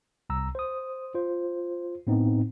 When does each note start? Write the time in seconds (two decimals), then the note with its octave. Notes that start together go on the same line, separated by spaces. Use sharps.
0.30 C2 A#5 E6
0.55 C5 D#6
1.14 F4 C5
2.07 A2 B3 C4 D#4